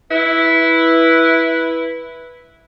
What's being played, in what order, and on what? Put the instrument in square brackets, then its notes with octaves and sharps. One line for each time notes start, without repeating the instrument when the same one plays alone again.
[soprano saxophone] E4 [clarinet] B4